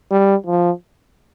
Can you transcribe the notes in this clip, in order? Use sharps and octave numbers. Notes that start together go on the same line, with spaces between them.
G3
F3